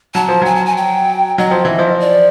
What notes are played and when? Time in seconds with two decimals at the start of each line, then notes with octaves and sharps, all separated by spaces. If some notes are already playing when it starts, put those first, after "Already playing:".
0.14 F#3 A5
0.29 F3
0.42 F#3 G#5
0.55 A5
0.65 G#5
0.76 G5
1.38 F#3 D#5
1.51 F3
1.65 E3
1.79 F3
2.00 D5